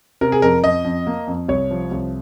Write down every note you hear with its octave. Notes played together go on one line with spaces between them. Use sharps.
C3 A#4
G#4
F2 A#4
F2 D#5
F2
A#3
F2
C2 C#5
F3
C2